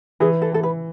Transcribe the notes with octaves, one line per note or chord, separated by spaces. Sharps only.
E3 G#4
A4
E3 A4
B4